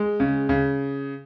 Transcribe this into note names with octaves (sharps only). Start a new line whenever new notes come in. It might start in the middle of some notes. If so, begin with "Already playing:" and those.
Already playing: G#3
C#3
C#3